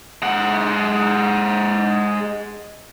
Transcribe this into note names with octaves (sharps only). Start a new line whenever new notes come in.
G#3 F#5